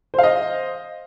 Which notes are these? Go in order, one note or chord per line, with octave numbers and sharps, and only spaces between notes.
C5 D#5 F5